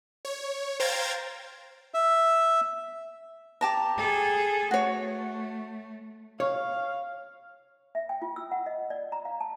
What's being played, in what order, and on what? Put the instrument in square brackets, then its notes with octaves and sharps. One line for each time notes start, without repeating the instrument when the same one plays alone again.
[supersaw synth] C#5
C5 F5 G5 A#5 G#6 A6
[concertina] E5
[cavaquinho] G4 A5 A#5
[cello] G#4 A4
[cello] A3 [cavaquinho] F#4 C#5
[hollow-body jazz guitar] C#5 [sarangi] F5
[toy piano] E5
G5
F4
E6
F#5
D#5
D5
A#5
F5
A5